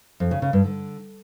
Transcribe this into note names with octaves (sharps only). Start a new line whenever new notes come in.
F2
C#3
C#3
G2
D3